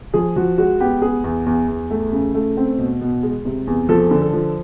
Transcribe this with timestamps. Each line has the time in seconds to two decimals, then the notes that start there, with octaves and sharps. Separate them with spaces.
0.14 F3 G#4
0.36 F3 F#4
0.58 G#3 F#4
0.80 B3 G4
1.02 B3 G#4
1.24 E2
1.46 E2
1.68 E2
1.91 A3
2.13 C#3
2.34 A3
2.57 C4
2.78 B2
3.01 B2
3.23 G#3
3.45 C3
3.67 E2
3.89 F3 A4
4.11 D3
4.22 A4
4.33 F3